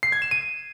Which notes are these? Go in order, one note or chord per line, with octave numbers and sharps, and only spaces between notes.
C7
G#6
E7
D#7